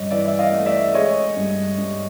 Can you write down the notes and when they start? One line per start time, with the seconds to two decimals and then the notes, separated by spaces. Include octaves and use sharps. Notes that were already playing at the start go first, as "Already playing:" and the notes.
Already playing: G2 C#5 D#5
0.11 E3 D5 E5
0.28 E5
0.39 D#5 F5
0.52 A3
0.66 D5 E5
0.94 G#3 C#5 D#5
1.36 G2
1.78 G2